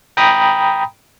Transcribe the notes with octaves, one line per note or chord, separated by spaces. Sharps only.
G5 A#5 B5 D#6